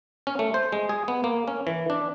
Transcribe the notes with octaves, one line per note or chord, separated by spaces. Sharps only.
C#4
A3
C5
G#3
G#4
B3
A#3
C#4
E3
D4